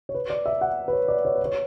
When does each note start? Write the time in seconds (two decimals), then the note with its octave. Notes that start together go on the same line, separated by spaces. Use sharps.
0.09 C#5
0.15 B4
0.30 D5
0.46 E5
0.61 F#5
0.88 B4
0.93 C#5
1.08 D5
1.25 C#5
1.35 B4
1.45 C#5